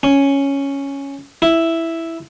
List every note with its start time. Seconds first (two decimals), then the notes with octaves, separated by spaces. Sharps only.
0.03 C#4
1.42 E4